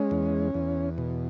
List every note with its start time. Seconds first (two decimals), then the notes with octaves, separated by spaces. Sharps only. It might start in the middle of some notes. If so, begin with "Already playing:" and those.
Already playing: G#3 C#4
0.11 E2
0.54 E2
0.98 B2